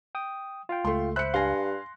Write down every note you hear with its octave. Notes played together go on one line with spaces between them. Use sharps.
G5 D#6
F4 F5 G5
C#2 A3 C6
C5 E5 B5 F#6 C#7
G2 F5 G#5 C6 A#6